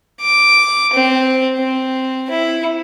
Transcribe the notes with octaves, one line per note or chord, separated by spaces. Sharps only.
D6
C4
C4
E4